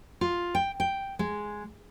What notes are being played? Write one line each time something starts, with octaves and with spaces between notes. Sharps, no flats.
F4
G5
G5
G#3